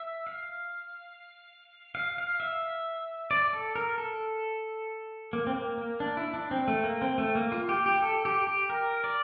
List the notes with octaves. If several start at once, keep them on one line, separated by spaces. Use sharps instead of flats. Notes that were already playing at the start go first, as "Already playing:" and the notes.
Already playing: E5
F5
F5
F5
E5
D5
A4
A#4
A4
A#3
C4
A#3
A#3
D4
E4
D4
C4
A3
A#3
C4
A3
A#3
F4
G4
G4
A4
G4
G4
A#4
D5